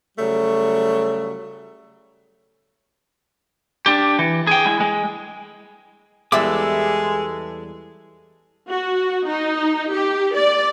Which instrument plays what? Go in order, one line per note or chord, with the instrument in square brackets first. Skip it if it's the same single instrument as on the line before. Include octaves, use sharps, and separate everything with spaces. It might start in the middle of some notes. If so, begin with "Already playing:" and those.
[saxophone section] C#3 F#3 G3 A3
[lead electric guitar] D4 G4
E3
G#4 G5
G#3 E4
G#3
[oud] E2 G3 E5 [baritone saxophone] G#3 [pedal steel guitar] A4 B4 D6
[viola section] F#4
D#4
G4
D5